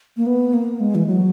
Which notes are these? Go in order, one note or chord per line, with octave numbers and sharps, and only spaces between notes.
A#3
B3
A#3
G#3
E3
F#3